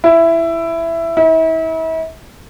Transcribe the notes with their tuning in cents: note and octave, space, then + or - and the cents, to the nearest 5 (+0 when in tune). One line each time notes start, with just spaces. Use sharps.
E4 +10
E4 -40